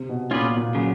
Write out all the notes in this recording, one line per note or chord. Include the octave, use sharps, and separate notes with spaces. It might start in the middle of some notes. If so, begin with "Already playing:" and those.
Already playing: C3
B2
A#2 C#4 F4 G#4 B4 D5
A#2
C#3 F#3 B3